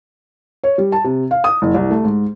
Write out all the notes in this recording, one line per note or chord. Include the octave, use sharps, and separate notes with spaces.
C#5
G3
A5
C3
F5
D#6
F#1
C2
A3
G#2